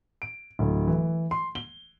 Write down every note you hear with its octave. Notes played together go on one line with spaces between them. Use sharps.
D7
D1
E3
C6
G7